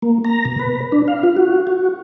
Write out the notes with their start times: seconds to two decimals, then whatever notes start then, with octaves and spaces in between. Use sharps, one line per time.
0.02 A#3
0.25 A#5
0.45 B2
0.59 B4
0.92 D4
1.08 F5
1.23 F4
1.37 F#4
1.67 F#4